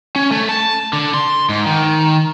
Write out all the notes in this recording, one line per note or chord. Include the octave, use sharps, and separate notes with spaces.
C#4
A3
A5
D3
C6
G#2
D#3